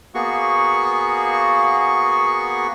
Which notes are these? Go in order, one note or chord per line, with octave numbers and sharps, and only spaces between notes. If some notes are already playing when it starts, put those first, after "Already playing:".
A#3 B3 F#4 G#4 C#6